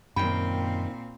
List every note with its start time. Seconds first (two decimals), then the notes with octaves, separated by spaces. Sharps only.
0.16 F#2 A#2 D#3 C4 G5 B5